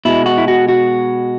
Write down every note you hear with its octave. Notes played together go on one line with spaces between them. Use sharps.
B2 G#3 E4
F#4
E4
F#4
F#4